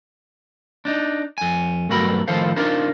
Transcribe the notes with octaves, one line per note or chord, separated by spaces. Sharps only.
D4 D#4
F2 G#5
B1 G2 F#3 A3 A#4 B5
A2 D#3 F3 A4 C5 F5
D4 D#4 F4 A#4 C5